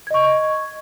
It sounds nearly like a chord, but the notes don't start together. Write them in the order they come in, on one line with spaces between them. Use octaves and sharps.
G#6 D#5 C#6